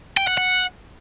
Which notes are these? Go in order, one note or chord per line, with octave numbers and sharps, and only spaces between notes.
G5
F#5
F#5